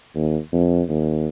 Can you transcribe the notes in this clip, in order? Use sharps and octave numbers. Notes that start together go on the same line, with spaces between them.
D#2
F2
D#2